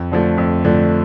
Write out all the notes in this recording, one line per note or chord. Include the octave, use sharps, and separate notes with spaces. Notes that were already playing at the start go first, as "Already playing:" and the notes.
Already playing: F2
D3 F3 A3
F2
D3 F3 A3